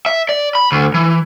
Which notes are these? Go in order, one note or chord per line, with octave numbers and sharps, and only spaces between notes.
E5
D5
B5
D2
E3